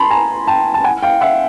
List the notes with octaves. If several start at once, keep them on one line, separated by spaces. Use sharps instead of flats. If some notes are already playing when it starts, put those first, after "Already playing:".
Already playing: A5 B5 C6
G#5 A#5
G5 A5
A5
F#5 G#5
F5 G5
E5 F#5